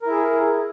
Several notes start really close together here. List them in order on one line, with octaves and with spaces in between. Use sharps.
A#4 E4 G#4